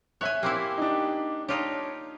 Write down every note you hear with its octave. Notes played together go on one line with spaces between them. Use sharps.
C#5 E5 G#5 F#6
A#3 C4 E4 G4
D4 D#4
D4 D#4 F4 G4 C#5